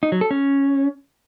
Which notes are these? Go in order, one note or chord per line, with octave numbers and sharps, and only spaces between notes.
D#4
F#3
A4
C#4